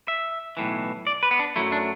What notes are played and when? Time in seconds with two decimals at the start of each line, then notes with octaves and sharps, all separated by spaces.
0.08 E5
0.57 B1 A2 E3
1.07 D5
1.23 B4
1.31 B3
1.39 D4
1.56 F#2 F#3 A3 E4
1.72 D4